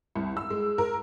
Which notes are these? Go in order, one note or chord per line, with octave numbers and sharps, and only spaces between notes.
C2
E6
G#3
A#4